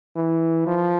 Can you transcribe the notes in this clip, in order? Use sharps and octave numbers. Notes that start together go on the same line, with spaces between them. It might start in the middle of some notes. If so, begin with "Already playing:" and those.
E3
F3